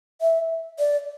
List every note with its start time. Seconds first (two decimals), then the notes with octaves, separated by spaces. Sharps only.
0.21 E5
0.79 D5